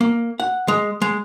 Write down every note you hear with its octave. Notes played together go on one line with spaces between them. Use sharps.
A#3
F#5
G#3
G#3